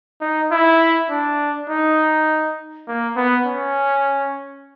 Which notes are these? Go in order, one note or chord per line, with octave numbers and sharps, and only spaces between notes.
D#4
E4
D4
D#4
A#3
B3
C#4